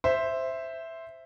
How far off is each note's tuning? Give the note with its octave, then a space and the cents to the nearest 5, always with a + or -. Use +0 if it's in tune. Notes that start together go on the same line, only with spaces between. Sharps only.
C5 +0 E5 +0